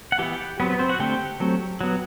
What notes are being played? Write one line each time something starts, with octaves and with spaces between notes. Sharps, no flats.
F#5
E3 B3 G4 G5
F#3 B3 C4 B4
B3 B4
C4 C5
F#4 F#5
D3 A3 C4 G4 G5
F#3 A3 C4
F#3 B3